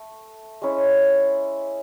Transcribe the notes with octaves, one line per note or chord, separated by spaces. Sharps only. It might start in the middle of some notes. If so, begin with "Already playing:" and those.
Already playing: A3
G#3 C#4 E4